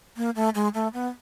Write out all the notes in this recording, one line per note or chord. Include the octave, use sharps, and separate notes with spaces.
A#3
A3
G#3
A3
B3